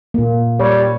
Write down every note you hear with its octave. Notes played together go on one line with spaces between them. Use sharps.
A#2 A#3
G3 C#5